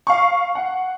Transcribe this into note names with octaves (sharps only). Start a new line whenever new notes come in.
F5 C#6
F#5